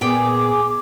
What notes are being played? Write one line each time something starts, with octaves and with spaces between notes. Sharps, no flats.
A#2 B3 G#4 G5 D6